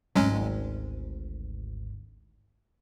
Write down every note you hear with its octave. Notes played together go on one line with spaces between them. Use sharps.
G#1 D2 F#3 G#3 C#4